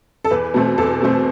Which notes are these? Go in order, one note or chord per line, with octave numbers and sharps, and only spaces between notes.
A4
E2 B4
B2 A3 C4
E2 A4
B2 A3 C4